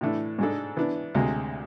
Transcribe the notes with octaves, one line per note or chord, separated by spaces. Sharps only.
A2 E3 A3 D4
G#2 G#3 D4 A4
E3 B3 D4
D2 C3 G#3